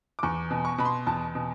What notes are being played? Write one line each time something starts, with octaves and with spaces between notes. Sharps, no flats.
D6
E2 C#6
B2
C#6
B2 B5
C6
E2 A5
B2